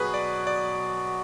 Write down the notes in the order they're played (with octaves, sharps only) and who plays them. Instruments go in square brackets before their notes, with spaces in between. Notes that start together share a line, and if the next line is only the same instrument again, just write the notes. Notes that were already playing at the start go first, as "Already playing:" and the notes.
Already playing: [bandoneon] B2 F#3 B3 F#4 [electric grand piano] G#4 B4
[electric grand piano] D5
D5